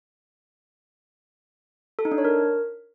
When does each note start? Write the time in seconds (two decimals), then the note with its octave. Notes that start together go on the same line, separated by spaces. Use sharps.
1.99 A4
2.05 D#4
2.12 D4
2.18 C#5
2.25 A#4